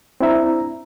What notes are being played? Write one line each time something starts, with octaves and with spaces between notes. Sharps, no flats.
C4 D4 E4 E5 A#5